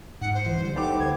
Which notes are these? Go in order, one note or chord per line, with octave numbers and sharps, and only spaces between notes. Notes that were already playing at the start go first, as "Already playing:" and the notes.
G#2 F#5
C5
C2 E3
D3 G3
A3 B3 D#4 G4 A4 C5 D6
D2 G#6